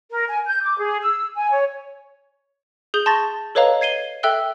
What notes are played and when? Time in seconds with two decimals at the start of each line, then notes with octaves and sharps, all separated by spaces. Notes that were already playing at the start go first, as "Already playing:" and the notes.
0.11 A#4
0.29 G#5
0.47 G6
0.63 D6
0.79 G#4
1.02 E6
1.36 G#5
1.51 C#5
2.94 G#4 D#6 G6 F7 G7
3.06 A5 C6 C#6 A6 A#6
3.55 A4 B4 C#5 D#5 F5 A#5
3.81 G#6 C7 D#7 G7
4.23 A4 E5 G5 E6 F#6 G7